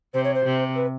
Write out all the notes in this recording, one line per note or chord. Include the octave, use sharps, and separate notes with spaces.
C3 C5
C#5
C5
C3
B4